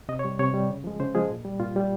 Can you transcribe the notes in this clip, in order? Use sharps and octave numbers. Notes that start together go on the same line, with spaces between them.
C3 D#5
C#5
G3
C3 C#5
G3
C#3
F3 G#3
C#3 C5
F3 G#3 G#4
A#2
G3
A#2 F4
G3